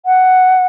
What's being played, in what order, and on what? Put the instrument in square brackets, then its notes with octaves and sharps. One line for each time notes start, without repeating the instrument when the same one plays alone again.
[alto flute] F#5